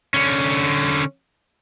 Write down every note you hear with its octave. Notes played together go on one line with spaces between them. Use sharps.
D3 C#4